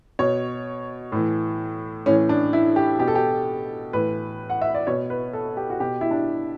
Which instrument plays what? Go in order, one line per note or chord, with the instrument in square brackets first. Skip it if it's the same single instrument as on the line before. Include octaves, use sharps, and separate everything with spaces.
[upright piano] B2 C#5
A2 E3
A2 E3 C#4
D4
E4
G4
B2 G4
A4
G4
A2 E3 B4
F#5
E5
D5
B2 C#5
B4
A4
G4
F#4
B2 G4
E4
D4